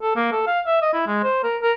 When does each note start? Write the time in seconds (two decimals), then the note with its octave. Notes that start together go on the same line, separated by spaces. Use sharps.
0.02 A4
0.16 A#3
0.32 A4
0.47 F5
0.67 E5
0.82 D#5
0.93 E4
1.07 G#3
1.23 C5
1.44 A#4
1.62 A#4